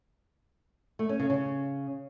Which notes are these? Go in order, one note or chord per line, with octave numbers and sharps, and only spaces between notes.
A3
C#4
C#3
C#3